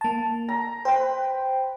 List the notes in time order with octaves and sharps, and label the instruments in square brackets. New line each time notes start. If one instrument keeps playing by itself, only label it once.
[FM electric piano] A#3 A5
[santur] A#5
[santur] B4 G5 [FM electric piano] C5